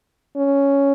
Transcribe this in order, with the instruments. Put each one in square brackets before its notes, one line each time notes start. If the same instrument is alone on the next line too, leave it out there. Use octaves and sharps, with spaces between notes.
[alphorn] C#4